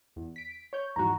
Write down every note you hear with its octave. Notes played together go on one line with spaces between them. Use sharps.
E2
B6 D7
C#5 G6
E2 G#2 F3 F#4 A#5